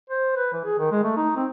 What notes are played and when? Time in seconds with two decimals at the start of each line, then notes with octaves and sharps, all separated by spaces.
0.10 C5
0.36 B4
0.53 E3
0.64 G#4
0.79 D#3
0.91 G#3
1.04 A3
1.17 D#4
1.36 C4